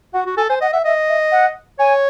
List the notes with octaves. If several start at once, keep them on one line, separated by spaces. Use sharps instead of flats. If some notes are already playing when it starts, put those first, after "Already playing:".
F#4 F#5
F#4
A4 G#5
C5 G#5
D#5 F#5
E5 F#5
D#5 E5
E5
F#5
C#5 G#5